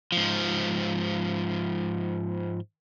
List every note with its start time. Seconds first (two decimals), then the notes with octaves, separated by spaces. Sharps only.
0.12 G#2 F3